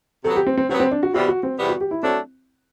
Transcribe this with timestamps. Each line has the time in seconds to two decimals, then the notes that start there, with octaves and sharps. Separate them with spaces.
0.24 C3 F#3 B3 A4
0.36 G4
0.47 C4
0.57 C4
0.69 C3 F#3 B3 C4
0.80 C4
0.91 D4
1.03 F#4
1.14 E2 C3 G3 B3 F#4
1.28 F#4
1.43 C4
1.58 E2 C3 G3 B3
1.69 F#4
1.81 G4
1.91 E4
2.03 F#3 A3 C4 D4